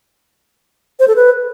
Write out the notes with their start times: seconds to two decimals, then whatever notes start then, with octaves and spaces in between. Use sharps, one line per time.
0.99 C5
1.08 A4
1.16 B4